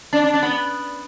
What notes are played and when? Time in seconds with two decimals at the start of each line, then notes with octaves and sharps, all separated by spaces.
0.13 D4
0.24 D4
0.34 D4
0.43 B3